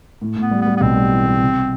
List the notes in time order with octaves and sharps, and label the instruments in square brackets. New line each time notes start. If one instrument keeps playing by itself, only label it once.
[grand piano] A2
[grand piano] A2 [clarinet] B3
[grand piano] G3
[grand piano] G3 [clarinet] B3
[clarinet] B3
[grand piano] B1 [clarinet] C4
[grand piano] G3
E3
G3
C3